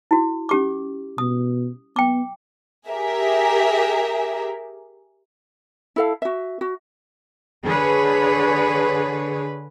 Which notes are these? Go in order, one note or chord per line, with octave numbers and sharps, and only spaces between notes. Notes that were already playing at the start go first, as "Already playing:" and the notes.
E4 F#4
C#4 G4 D6
B2 D#6
B3 G5 D6
G4 G#4 A#4 E5
E4 A4 F5
F#4 E5
F#4
D3 G#4 B4 C#5